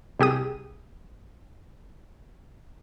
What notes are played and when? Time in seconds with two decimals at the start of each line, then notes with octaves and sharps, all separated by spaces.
0.19 C2 G4 G#4 D#6